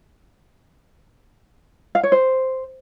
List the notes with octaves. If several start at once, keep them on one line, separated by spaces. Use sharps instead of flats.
F5
C#5
C5